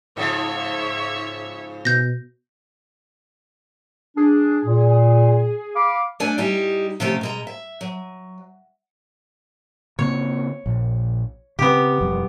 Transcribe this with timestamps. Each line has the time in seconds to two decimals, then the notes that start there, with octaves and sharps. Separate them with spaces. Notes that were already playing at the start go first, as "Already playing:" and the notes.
0.17 G#2 C#3 F3 C#5 E5
1.85 B2 G6 A#6
4.17 D4 G#4
4.65 A#2
5.75 F5 B5 D6
6.20 A3 D4 D5 G#5
6.38 G3 D#4 E4 G4
7.00 C3 F3 A3 C#4 G4
7.21 B2 G#3 A#5
7.47 E5
7.81 F#3
9.99 C#3 A#3 C4 C#5
10.66 A#1
11.59 C#3 B3 C4 G4
12.01 E1 F2 G3